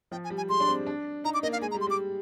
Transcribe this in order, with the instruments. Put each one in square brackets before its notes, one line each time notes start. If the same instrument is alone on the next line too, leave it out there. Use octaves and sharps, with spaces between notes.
[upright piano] F3 [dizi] G5
[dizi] G#5
[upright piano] G3
[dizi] G#5
[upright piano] G#3 [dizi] C6
[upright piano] D4
C4
D4
[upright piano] D#4 [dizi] A#5
[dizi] D6
[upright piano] A#3 [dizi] D#5
[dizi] F5
[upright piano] G#3 [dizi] G#5
[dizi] A#5
[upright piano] G3
[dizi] C6
[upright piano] G3 [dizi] D6